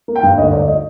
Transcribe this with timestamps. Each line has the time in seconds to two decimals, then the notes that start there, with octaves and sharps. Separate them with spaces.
0.08 A#3
0.16 G5
0.23 G2
0.38 D2 D#5
0.53 D2 D5
0.68 D#5